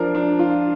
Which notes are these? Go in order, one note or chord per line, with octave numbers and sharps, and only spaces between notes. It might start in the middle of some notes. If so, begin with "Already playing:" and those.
Already playing: F3 D4 A#4
D4
F4